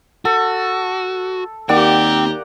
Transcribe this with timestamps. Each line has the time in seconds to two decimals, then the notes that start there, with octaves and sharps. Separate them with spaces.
0.25 F#4 A4
1.69 D#2 A#3 C4 G4 D5 F#5 G5 A#5